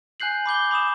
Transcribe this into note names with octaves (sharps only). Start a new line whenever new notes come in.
G#5 F#6 G6 C7 F#7
B5 D6 G6 G7
B5 D6 D#6 E7